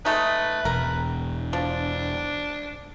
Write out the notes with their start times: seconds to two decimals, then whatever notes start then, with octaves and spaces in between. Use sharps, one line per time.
0.05 G#3 A3 D#4 B4
0.65 E1 A#4
1.53 F3 D4